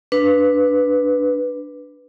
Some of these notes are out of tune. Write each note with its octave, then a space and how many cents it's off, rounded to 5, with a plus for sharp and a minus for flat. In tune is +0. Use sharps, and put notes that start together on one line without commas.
D4 +0 B4 +0